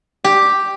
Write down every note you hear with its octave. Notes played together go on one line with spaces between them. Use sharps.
G4